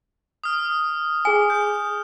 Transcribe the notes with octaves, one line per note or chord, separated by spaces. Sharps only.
D#6 F6
G#4 G#5
G6